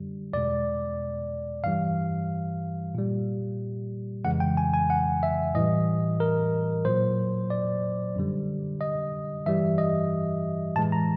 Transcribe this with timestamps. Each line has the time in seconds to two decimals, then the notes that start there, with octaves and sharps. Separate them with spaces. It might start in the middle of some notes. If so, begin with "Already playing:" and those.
Already playing: F#2 D3 G3
0.33 E2 B2 G#3 D5
1.64 G2 E3 G3 F5
2.95 A#2 G3
4.24 F2 C#3 E3 G#3 F#5
4.40 G5
4.57 G#5
4.74 G#5
4.90 F#5
5.23 E5
5.55 A2 E3 G3 D#5
6.20 A#4
6.85 A#2 F#3 C5
7.50 D5
8.16 F#2 D3 G3
8.81 D#5
9.46 G2 E3 G3 E5
9.78 D#5
10.76 A2 E3 G#3 A5
10.92 A#5